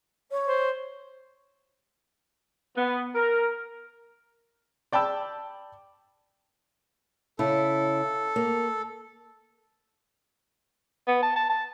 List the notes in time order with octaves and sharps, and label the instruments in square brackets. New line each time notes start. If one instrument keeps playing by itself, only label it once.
[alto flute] C#5
[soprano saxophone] C5
[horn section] B3
A#4
[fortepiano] D5 G5 A5 B5 E6
[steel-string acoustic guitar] C#3 E4 [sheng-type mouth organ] A4
[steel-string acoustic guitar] A#3
[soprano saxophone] B3
A5
A5
A5